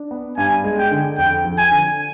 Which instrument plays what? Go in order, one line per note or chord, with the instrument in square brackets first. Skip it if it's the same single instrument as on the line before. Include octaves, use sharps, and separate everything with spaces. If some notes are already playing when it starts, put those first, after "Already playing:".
Already playing: [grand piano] D4
B3
[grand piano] G2 [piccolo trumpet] G#5
[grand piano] G#3
[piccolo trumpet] G5
[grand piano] D3
[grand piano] F2 [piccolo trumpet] G5
[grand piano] F3
[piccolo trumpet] G#5
[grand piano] D3